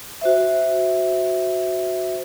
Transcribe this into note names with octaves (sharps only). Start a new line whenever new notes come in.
F#4 C5 E5